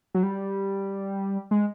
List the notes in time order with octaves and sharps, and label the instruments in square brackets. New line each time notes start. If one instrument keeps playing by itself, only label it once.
[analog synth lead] F#3
G3
G#3